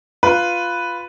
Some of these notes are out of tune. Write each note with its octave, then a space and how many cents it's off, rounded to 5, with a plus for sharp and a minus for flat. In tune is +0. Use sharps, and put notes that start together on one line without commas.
F4 +0 B4 +0